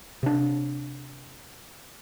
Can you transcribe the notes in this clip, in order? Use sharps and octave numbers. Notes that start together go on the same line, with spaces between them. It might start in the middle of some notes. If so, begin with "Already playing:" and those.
C3 D4